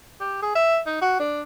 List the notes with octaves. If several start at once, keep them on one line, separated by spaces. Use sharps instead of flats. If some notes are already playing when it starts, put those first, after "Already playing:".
G4
G#4
E5
D#4
F#4
D4